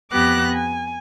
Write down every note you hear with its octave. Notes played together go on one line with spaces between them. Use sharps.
F2 B3 G4 D6 F#6 A#6
G#5